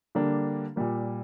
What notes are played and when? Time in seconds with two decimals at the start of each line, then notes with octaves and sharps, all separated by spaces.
0.15 D3 G3 A#3 D4
0.76 A#2 G3 A#3